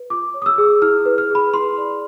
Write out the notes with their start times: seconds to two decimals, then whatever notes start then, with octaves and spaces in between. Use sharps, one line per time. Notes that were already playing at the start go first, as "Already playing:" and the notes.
Already playing: B4
0.10 F4 D6
0.34 C#5
0.42 D#6
0.46 E6
0.58 G#4
0.82 E4 F6
1.06 B4
1.18 F6
1.30 G#4 B5
1.54 E4 C6
1.78 D5
1.90 C6